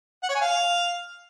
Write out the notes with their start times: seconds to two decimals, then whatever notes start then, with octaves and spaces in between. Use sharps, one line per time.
0.23 F#5
0.29 C#5
0.35 G#5
0.41 F5